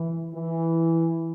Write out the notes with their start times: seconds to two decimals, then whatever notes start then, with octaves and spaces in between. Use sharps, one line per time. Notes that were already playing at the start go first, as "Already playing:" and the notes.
Already playing: E3
0.34 E3